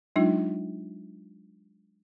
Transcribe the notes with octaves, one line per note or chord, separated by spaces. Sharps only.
F#3 G#3 D4 D#4 F4